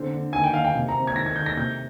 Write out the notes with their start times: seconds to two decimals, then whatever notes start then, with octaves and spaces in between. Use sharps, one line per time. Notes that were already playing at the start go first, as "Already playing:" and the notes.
Already playing: D3 C4
0.12 D3
0.33 D#3 G#5
0.44 G5
0.54 D#3 F5
0.64 G5
0.74 C3
0.89 A#5
0.95 C4
1.07 G#6
1.16 D#3 A#6
1.26 G#6
1.36 D#3 G6
1.46 A#6
1.57 C3 G6